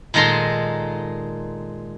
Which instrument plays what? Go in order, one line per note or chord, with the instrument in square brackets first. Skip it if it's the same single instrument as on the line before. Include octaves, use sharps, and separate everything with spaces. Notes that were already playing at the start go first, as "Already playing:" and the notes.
[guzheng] A#2 D#3 G#3 A4 A#5 C6